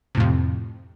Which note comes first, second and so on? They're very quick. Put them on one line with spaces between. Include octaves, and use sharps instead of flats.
C3 A2 F2